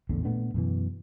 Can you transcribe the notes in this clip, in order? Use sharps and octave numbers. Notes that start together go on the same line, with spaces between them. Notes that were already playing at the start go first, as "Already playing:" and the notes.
A#1 E2 A2 D3
A#2 A3 B3 D4
F#2 B2 E3